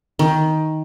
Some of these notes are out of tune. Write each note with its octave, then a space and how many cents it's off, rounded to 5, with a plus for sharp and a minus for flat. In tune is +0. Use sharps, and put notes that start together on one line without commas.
D#3 +10